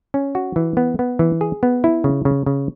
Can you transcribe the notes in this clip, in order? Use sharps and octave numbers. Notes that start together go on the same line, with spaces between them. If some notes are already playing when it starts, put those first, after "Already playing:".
C#4
F#4
E3
B3
B3
E3
G#4
B3
E4
C#3
C#3
C#3